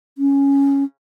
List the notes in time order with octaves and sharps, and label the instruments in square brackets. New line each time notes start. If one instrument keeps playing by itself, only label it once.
[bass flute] C#4